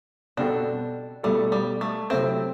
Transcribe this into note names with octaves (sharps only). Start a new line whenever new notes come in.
B2 G3 C4 D4 F#4 A4
B2 G3 A3 E4 A4
G3
A3
C3 F#3 A3 C4 E4 A4